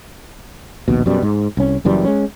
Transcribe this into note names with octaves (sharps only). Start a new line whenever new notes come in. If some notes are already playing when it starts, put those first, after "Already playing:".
A#1 D#2 B2
F#2 B2 G3
G#2
C2 C#4
F#1 F#2 E3 G3
G#3 C#4